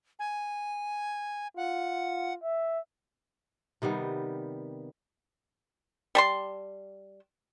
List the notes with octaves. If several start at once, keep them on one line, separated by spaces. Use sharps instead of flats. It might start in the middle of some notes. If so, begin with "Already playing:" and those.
G#5
F4 F#5
E5
C3 D#3 G3 B3
G3 A5 C6